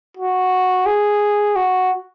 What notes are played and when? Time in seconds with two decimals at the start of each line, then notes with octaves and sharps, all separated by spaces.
0.17 F#4
0.86 G#4
1.56 F#4